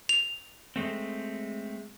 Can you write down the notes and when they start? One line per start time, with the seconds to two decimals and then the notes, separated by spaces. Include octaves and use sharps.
0.09 F7
0.76 G#3 A3 C4